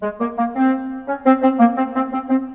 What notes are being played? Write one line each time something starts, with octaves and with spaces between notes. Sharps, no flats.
G#3
A#3
A#3
C4
C#4
C4
C4
A#3
C4
C4
C4
C4